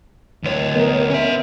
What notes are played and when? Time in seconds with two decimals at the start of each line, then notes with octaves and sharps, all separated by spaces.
0.44 D2 C#5
0.75 B3 A#4 D#5
1.10 C#4 E5